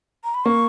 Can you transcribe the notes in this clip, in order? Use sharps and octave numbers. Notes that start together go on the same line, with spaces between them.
A#5
B5
A#3 C#6